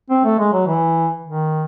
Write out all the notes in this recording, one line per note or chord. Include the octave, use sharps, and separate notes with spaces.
C4
A3
G#3
F#3
E3
D#3